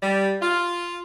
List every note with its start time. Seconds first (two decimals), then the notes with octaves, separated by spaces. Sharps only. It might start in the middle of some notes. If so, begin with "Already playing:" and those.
0.02 G3
0.41 F4